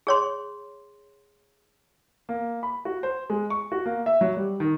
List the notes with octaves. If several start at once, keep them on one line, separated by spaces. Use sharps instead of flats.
G#4 C#5 C6
A#3
B5
F#4
C5
G#3
C#6
F#4
A#3
E5
F#3
G3
D#3